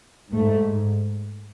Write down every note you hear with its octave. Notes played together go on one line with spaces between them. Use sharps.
G#2 A3